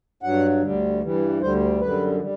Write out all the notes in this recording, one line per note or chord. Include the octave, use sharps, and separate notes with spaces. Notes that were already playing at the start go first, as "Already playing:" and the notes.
G2 F#3 F#5
D2 D3 G3
G2 E3 G3
D2 D3 G3 C5
F#2 D3 G3 B4
G3